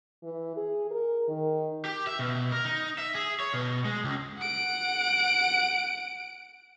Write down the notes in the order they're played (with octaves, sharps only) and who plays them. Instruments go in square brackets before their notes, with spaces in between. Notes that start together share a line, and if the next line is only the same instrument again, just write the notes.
[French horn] E3
G#4
A#4
D#3
[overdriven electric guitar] G4
E5
B2
A#4
D#4
E5
G#4
C#5
B2
G#3
C#2
[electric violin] F#5 D7